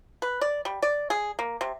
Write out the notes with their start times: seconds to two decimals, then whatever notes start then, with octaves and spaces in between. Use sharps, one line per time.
0.22 B4
0.41 D5
0.65 G3
0.82 D5
1.10 G#4
1.39 A#3
1.61 C3